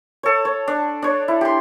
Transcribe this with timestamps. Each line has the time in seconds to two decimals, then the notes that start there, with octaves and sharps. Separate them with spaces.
0.23 A4 C#5
0.45 C#5
0.68 D4
1.02 D4 C#5
1.28 E4
1.41 G4 C6